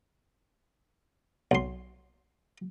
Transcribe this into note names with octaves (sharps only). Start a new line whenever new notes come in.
B1 C6